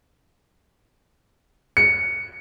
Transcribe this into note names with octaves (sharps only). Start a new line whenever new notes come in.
C#7